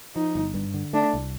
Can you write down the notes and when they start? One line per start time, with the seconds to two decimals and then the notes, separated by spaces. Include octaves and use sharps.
0.15 F3 D#4
0.35 G1
0.54 G2
0.74 D3
0.93 A3 D4
1.13 C2